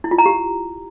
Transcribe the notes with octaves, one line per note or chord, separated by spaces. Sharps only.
E4
F4
A#5
G4